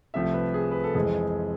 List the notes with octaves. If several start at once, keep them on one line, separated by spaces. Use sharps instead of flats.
C2 C3 F3 A3 E5
B4
G#4
B4
A4
F2 E3 G#3 C4 G#4